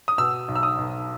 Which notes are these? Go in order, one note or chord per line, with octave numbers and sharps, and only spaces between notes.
D#6
B2 E6
B1
E6
D#6
B1